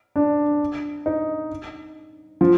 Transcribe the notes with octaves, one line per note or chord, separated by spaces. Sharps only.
D4
D#4
F3